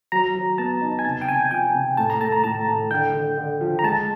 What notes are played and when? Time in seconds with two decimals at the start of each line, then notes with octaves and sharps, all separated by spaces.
0.12 F#3 A#5
0.35 F#3
0.58 B3 A5
0.81 D#4
0.99 G#5
1.05 C3 A5
1.21 G5
1.28 C3 G#5
1.51 F3 G5
1.74 C3
1.97 A2 A5
2.10 A#5
2.21 A3 A5
2.32 A#5
2.44 A2 A5
2.68 A2
2.91 D3 G5
3.14 D3
3.38 D3
3.61 F3
3.79 A#5
3.83 G#3 A5